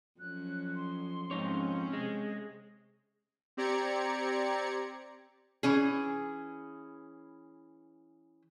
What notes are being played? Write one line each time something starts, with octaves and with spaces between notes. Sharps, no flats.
F2 F#3 C#4 F#6
C6
F2 G#2 C4 C#4 D#4 C#5
C3 G#3 G#4
C4 G4 D5 A#5 G#6 C#7
E3 C#4 G#4